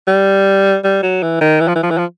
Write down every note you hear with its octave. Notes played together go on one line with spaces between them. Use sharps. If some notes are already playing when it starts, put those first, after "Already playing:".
G3
G3
F#3
E3
D#3
E3
F3
E3
F3
E3
F3